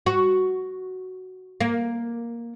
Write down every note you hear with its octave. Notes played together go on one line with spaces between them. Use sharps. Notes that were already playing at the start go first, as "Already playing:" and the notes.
F#4
A#3